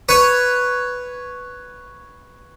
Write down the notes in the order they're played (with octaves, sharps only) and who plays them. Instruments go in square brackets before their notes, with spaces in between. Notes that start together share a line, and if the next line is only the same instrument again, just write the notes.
[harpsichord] B4 C#5